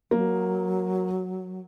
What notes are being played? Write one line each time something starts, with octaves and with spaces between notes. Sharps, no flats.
F#3 A#3